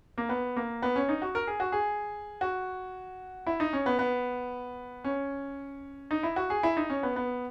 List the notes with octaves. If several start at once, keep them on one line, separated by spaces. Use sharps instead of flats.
A#3
B3
A#3
B3
C#4
D#4
F#4
A#4
G#4
F#4
G#4
F#4
E4
D#4
C#4
B3
B3
C#4
D#4
E4
F#4
G#4
E4
D#4
C#4
B3
B3